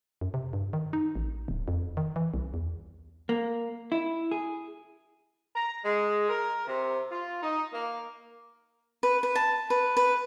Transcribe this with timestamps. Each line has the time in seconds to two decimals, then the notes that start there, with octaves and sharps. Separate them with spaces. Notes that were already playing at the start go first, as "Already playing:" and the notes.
0.21 F#2
0.34 C3
0.53 G2
0.73 D#3
0.93 D#4
1.15 A1
1.48 D1
1.68 F2
1.97 D#3
2.16 E3
2.34 C2
2.54 E2
3.29 A#3
3.92 E4
4.31 G#4
5.55 A#5
5.84 G#3
6.29 A#4
6.67 C3
7.10 F4
7.42 D#4
7.73 A#3
9.03 B4
9.23 B4
9.35 A5
9.70 B4
9.97 B4